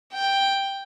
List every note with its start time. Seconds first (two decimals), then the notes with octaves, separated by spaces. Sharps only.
0.13 G5